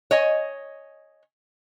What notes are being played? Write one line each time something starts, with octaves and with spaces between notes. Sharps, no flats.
C#5 D#5 G#5